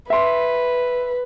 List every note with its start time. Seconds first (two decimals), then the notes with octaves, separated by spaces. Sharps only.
0.10 B4 E5 C6